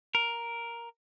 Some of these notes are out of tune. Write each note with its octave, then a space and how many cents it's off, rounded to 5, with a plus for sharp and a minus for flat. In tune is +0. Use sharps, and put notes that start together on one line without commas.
A#4 +5